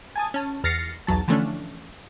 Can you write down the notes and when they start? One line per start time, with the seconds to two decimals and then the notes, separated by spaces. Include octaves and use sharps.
0.16 G#5 A5 D#6
0.34 C#4 A5
0.64 E2 F6 A6 A#6 C7 C#7
1.07 B1 E2 F#3 A5
1.28 D3 E3 F3 A3 C#4 D4